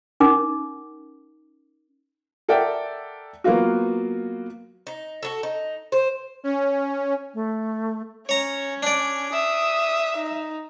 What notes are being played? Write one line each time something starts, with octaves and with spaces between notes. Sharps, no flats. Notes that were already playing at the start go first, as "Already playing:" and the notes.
C#4 D#4 A#4 D6
A4 A#4 D5 E5 F#5 G5
F#3 A#3 B3 F4 F#4
D#4
F#4 A4
D#4
C5
C#4
A3
C#4 C#5 A#5
D4 D5
E5 D#6
D#4